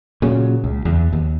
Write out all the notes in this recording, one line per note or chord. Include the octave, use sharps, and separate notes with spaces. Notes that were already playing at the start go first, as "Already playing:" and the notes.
A#2 C#3 F#3
C#2
E2
D#2